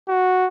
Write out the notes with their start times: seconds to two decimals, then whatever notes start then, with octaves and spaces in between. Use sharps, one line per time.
0.08 F#4